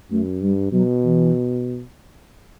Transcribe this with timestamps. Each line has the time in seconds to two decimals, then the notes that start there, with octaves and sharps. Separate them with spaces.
0.11 F#2 A3
0.41 G2 G3
0.72 B2 F#3
1.03 E3